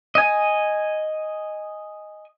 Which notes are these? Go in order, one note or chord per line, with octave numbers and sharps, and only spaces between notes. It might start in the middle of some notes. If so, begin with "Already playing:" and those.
D#5 G#5